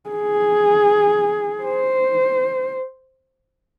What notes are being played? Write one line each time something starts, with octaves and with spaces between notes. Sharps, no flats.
G#4
C5